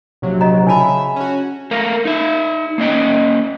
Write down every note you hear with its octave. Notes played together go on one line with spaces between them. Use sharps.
A#1 C3 F#3
D#5 A#5
C#3 D4 E5 A5 B5
C#4 F#4
A3 A#4 F5
D#4 E5
A#3 C#4 D#5 G5